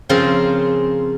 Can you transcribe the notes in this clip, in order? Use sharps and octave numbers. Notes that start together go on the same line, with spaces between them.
C#3 F3 C4 F4 A#4